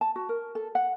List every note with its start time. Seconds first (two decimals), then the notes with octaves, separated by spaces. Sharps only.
0.01 A5
0.16 F#4
0.29 A#4
0.55 A4
0.75 F#5